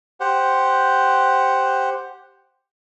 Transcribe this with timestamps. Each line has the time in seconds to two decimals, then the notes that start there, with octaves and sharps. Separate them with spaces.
0.20 G4 C5 F#5